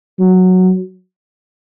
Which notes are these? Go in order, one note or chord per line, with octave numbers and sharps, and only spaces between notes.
F#3